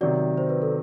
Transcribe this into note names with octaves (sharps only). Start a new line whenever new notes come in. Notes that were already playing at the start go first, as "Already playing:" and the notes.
C3 D#3 F#3 D5
C5
B4
A4